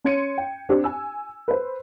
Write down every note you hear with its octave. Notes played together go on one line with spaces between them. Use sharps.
C#4 C#5 C6 G#6 C#7 D#7
G5
C4 D4 G4
G#5 E6
B4 C5